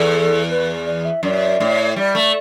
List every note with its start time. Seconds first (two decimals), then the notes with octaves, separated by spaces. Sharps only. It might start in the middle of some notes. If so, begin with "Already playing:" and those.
Already playing: E2 A4
0.50 B4
0.86 D5
1.05 E5
1.23 F#2 D5
1.60 A2
1.96 G3 D5
2.15 A3